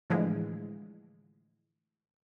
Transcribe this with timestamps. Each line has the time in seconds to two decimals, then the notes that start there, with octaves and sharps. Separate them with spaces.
0.10 A2 D3 E3 F3 G#3